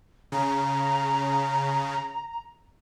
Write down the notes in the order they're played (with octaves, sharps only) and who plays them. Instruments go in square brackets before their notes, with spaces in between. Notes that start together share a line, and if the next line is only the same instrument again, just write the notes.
[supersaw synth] C#3 [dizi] A#5